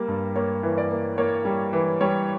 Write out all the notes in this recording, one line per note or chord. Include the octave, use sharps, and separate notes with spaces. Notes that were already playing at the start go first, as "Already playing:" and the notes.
Already playing: G3 A#3
G2
A#3 C#5
E3
D5
A#3
A#3 C#5
G3
E3
G3 C#5